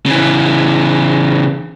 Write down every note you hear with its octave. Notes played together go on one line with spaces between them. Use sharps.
C#3 E3